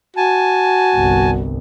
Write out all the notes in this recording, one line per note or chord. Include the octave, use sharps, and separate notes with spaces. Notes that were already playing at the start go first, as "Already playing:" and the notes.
F#4 G#5 A5
G1 C2